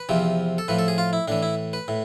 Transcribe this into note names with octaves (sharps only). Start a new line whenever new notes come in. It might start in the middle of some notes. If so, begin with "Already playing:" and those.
Already playing: B4
E2 C3 F3
A4
A2 F3 B4
A4
G#4
F4
E4
A2 E3 D4
E4
B4
A2